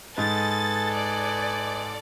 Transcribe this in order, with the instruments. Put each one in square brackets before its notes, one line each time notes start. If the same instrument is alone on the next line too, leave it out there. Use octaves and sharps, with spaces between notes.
[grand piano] G#2 [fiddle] A4 [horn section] B4 D#5 G#5 [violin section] A6
[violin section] D5